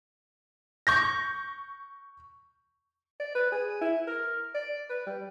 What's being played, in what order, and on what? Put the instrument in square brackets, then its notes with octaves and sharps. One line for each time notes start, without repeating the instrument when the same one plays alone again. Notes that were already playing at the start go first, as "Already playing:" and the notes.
[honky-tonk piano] C#6 G6 A#6
[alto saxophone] D5
B4
G#4
E4
A#4
D5
B4
G3